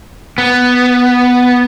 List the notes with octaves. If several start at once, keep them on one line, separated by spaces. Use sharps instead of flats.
B3